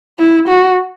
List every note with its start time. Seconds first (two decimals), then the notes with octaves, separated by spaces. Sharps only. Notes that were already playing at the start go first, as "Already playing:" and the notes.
0.19 E4
0.48 F#4